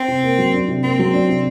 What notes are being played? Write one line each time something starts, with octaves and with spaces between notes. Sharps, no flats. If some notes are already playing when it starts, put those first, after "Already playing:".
Already playing: C4
C3
A#3
F#3
D4
C3
A#3 C4
F#3
D4
C3